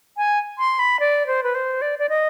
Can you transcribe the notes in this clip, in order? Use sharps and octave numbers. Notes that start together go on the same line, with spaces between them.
G#5
C6
B5
D5
C5
B4
C5
D5
D5
D#5